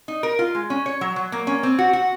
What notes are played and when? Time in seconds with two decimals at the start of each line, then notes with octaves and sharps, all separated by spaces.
0.08 D#4
0.23 A#4
0.39 F4
0.55 G#3
0.70 C#4
0.86 C#5
1.01 F#3
1.16 F#3
1.32 A#3
1.47 C#4
1.63 C4
1.79 F#4
1.93 F#4